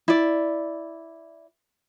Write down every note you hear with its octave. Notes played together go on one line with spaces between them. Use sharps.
E4 D5